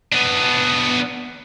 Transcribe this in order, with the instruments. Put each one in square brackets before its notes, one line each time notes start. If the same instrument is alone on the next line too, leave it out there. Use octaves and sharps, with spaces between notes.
[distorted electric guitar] B3 D4